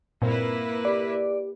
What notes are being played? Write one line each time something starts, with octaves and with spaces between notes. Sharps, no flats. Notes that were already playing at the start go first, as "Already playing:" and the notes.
G2 A#2 A#3 C4 E4 B4
G4 D5